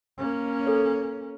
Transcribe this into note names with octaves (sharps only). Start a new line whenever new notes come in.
A#3 C#4
A4 C#5